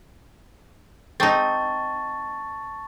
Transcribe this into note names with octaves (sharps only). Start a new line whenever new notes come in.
C4 D#4 A5 C#6 A6